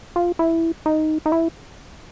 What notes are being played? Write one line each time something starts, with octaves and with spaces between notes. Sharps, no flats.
F4
E4
D#4
D#4
E4